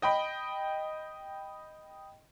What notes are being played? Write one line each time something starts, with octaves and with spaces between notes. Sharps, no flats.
D#5 G5 B5